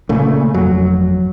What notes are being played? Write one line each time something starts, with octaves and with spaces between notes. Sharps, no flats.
A#2 C#3 A3 A#3
G1 F2 F#3